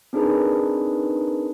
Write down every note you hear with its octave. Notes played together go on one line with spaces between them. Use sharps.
C4 D4 D#4 G#4 A#4 B4